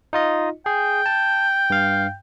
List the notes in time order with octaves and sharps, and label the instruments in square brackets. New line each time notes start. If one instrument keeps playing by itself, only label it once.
[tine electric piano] D#4 F4 D#5
[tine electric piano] G#4 [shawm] G5
[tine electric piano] A5
G2 F5